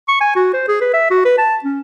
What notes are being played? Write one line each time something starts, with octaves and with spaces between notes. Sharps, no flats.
C#6
G#5
F#4
C5
G#4
B4
E5
F#4
B4
A5
C#4